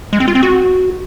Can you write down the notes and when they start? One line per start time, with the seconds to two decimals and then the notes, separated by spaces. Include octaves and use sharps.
0.13 G#3
0.20 C4
0.28 F4
0.35 C4
0.43 F#4